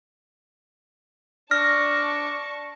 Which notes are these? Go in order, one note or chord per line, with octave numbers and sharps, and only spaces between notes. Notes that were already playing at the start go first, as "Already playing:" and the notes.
D4 A5 C#6 F6 A#6